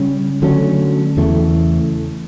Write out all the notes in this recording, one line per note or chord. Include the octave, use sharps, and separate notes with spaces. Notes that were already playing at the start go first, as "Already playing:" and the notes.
Already playing: C#3 G3 C#4
D3 F#3 A3 C#4
E2 C#3 E3 A3